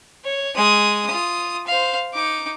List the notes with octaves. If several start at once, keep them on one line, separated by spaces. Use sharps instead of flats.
C#5
G#3 D#6
F4 D#6
C5 F5
D#4 D6